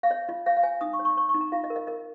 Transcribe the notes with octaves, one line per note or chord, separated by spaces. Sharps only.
F5
C#5 D#5
F4 D#5
C#5 F5
F5
C#5 G#5
D#4 D#6
C#6
C#5
C#6
C#5 C#6
C#6
D#4
A#5
F4 F5
D#5
A#4
D#5
A#4 D#5